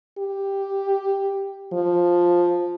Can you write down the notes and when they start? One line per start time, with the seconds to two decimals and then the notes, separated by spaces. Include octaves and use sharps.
0.19 G4
1.73 F3